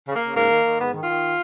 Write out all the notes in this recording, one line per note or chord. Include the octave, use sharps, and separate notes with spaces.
C#3
A#3
C#3
G#2 A#3
D#3
D#3
G#2 B3
D#3
F4
D#3